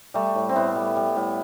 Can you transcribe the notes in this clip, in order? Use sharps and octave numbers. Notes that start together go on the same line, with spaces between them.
G3 A3
A2
C4
A2 B3
G3
G3
A2